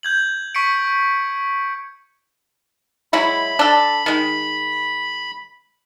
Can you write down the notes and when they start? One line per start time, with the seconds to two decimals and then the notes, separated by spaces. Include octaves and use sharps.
0.03 G6 G#6 F#7
0.55 C#6 B6 C#7 D7
3.13 F#3 G#3 E4 B5
3.59 D4 A4
4.06 D#3 G#3